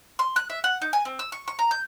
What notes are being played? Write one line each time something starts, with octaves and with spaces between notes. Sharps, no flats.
C6
F#6
E5
F#5
D#4
G#5
C4
E6
C#6
C#6
A#5
G6